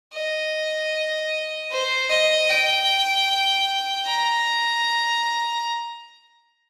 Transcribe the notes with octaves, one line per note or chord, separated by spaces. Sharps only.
D#5
C5
D#5
G5
A#5